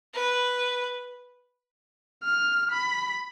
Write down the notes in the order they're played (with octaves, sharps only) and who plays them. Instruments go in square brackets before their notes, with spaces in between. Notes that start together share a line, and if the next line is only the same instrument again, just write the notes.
[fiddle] B4
[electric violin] F6
B5